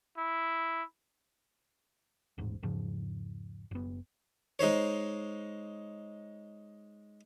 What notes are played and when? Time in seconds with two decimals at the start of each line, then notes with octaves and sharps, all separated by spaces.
0.18 E4
2.38 D#1 A1 G#2
2.62 E2 G#2 C#3 F3
3.71 F#1 B3
4.59 G#3 D#4 C5 C#5